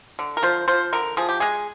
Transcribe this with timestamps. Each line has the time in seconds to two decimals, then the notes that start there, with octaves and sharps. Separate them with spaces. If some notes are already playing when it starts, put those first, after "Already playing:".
0.19 D3
0.37 A#4
0.43 F3 C5
0.68 F3 C5
0.93 D3 A#4
1.17 F3 G#4
1.29 G4
1.40 G#3 G#4